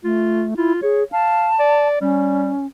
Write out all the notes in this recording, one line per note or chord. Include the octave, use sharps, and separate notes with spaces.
A3 F4
E4 F4
G#4 C#5
F5 A5
D5
G3 C#4